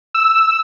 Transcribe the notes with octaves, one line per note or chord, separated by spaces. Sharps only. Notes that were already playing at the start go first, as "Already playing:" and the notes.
E6